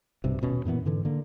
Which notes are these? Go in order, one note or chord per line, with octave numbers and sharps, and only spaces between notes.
B1 G2 C3
D#1 B2 C#4
F#2 A#2 E3 B3
G#2 D3 E3
D3 A#3